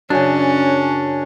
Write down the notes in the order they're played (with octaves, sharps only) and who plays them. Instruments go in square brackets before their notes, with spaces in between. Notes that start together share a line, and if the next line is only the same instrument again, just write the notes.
[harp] F#2 C#3 [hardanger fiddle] C#4 [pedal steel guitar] D4